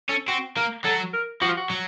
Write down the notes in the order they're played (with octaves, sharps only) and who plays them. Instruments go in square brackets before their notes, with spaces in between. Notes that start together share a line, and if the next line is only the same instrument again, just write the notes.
[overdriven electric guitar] C#4 [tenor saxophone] A4
[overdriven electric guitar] C4 [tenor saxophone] F#4
[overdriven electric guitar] A#3 [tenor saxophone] A#4
[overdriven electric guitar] F#3 [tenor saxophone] A4
[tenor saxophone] A#4
[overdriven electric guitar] F3 [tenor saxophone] F#4
[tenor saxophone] F4
F#4
[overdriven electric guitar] F#3